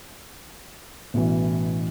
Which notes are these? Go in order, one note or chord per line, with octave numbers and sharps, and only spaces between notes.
A1 B2 E3